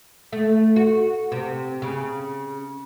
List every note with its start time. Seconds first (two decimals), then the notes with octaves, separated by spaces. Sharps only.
0.33 A3
0.76 F#4
1.32 C3
1.82 C#3